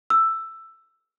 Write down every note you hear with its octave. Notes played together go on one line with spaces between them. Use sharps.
E6